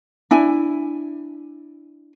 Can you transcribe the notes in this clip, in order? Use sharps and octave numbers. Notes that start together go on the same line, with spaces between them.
D4 E4 G#5